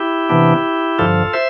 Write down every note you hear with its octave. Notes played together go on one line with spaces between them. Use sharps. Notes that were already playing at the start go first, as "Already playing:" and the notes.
Already playing: E4 G4
C3 E3 B3 D4
G2 D3 F3 F4 A4
C5 E5